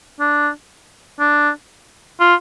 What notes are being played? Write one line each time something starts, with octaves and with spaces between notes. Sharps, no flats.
D4
D4
F4